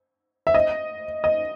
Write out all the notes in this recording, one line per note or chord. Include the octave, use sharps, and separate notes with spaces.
E5
D#5
D#5